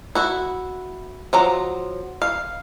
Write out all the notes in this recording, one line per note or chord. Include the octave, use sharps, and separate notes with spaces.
E4 F#4
F3 F#3 A#5
F5